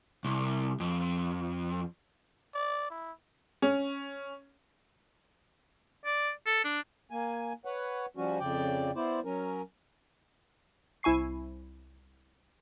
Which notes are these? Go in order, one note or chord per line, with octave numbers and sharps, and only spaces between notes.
C2
F2
D5
E4
C#4
D5
A4
D4
A#3 G#5
B4 C#5 F#5
F3 G3 C#4 F#4
F2 C#3 D5 G5
B3 E4 C5 D5
F#3 C#4 A#4
C2 E4 G#5 C#6 C7